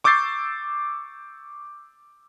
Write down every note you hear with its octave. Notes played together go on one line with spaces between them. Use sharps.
C#6 D6 E6 G6 A6 C7